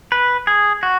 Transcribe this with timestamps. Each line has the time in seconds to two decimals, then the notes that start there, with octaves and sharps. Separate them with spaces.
0.12 B4
0.47 G#4
0.83 F#4